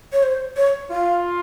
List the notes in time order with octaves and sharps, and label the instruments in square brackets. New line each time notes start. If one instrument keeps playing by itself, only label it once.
[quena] C#5
C5
C#5
[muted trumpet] F4 [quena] F5